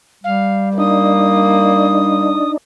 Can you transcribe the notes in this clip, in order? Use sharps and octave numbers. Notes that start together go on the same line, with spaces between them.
G3 F5
A#3 D4 D#4 D#6